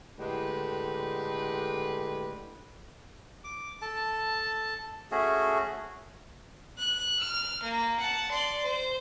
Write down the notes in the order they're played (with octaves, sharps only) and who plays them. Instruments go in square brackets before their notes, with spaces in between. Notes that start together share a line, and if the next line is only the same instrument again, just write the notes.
[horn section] A2 D3 G#3 G4 B4
[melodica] D6
A4 A5
A3 C#4 F#4 G#4
[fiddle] F#6
F6
A#3
F#5 A5
D5 C6
C5